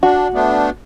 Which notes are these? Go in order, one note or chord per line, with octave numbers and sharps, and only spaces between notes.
D4 F#4
A3 B3 D4